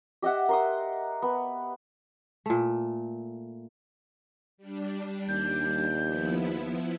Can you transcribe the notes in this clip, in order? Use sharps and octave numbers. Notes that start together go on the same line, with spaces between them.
G4 D#5 E5 F#5
A#4 C6 D#6
B3
A#2 A3
G3 D4
D#2 G6
F3 B3 E4